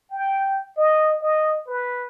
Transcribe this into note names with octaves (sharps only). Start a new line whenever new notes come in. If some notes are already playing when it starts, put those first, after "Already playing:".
G5
D#5
D#5
B4